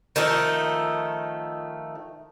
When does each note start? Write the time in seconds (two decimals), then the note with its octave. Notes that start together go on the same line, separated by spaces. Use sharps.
0.16 D#3 F3 A3 D#4